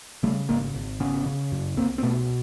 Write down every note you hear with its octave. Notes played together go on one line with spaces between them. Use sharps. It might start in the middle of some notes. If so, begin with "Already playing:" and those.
C#3 G3 A3
G#1 G#3 A#3
G#1
C#3 B3 C#4
C#3
F#2
C2 A#3 C4
C4
B2 A3 B3